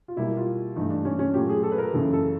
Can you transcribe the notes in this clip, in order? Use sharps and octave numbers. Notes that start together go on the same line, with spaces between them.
F4
B2 G3 A#3 E4
F4
G2 E3 A3 D#4
D4
C#4
C#4
A#2 F#3 A3 G4
G#4
A4
B4
A#4
F#2 C#3 E3 A4
A4